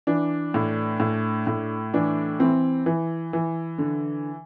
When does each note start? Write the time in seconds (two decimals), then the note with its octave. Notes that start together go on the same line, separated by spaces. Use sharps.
0.07 E3 D4
0.54 A2
1.00 A2
1.47 A2
1.94 E3 D4
2.39 E3 C4
2.86 E3
3.33 E3
3.78 D3